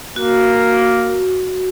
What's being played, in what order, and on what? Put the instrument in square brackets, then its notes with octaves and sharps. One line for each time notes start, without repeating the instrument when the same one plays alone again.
[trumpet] A#3 [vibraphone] F#4